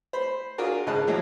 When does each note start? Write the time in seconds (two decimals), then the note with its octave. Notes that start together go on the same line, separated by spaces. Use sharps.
0.13 C5 B5
0.58 D4 F4 F#4 G#4 A#4 D5
0.86 G#2 C#3 D#5 A5 B5 F#6
1.07 F3 F#3 A#3 E4 C#5